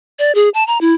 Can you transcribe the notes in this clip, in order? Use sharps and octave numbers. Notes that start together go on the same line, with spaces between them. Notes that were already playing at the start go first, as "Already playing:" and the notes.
D5
G#4
A5
A#5
E4